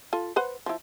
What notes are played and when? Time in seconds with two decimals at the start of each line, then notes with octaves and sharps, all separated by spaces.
0.13 F4 A4
0.36 B4 C5 F#5
0.66 F3 E4